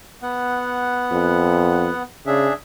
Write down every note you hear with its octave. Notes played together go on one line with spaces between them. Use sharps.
B3 F#5
F2
C#3 D4 G#4 E5